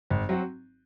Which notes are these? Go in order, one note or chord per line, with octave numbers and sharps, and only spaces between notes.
G#1
F#3 C4 F#4